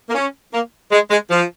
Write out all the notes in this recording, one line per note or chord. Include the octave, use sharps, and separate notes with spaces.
A#3
C#4
A#3
G#3
G#3
F3